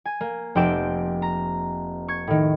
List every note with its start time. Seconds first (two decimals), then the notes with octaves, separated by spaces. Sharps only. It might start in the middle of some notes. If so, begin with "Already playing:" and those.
0.05 G#5
0.21 A#3
0.55 F1 C4 G5 D6 E7
1.22 A#5
2.08 C#6 G#6
2.27 A2 D#3